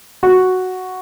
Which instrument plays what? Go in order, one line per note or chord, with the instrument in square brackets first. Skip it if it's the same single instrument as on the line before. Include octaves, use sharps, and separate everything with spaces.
[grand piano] F#4